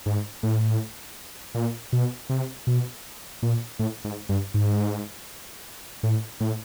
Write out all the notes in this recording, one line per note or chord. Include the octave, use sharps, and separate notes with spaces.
G#2
A2
A#2
B2
C3
B2
A#2
A2
G#2
G2
G#2
A2
A2